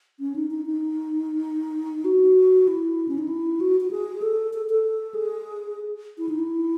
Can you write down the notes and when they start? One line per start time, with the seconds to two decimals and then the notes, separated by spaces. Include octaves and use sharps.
0.20 C#4
0.36 D#4
0.51 D#4
0.66 D#4
2.05 F#4
2.67 E4
3.08 C#4
3.18 D#4
3.28 E4
3.60 F#4
3.80 F#4
3.91 G#4
4.22 A4
4.53 A4
4.70 A4
5.14 G#4
6.18 E4
6.29 D#4
6.39 E4